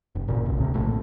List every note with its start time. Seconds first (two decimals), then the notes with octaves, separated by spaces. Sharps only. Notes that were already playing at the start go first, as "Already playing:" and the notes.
0.15 F1
0.28 F#1 A#2 C#3
0.45 D1 B1
0.58 D2 C3
0.74 A#1 A2